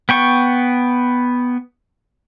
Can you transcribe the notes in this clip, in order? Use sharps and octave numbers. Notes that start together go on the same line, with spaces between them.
B3 G5 C#6